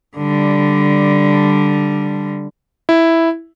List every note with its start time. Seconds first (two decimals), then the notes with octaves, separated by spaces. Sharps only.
0.17 D3 G3
2.89 E4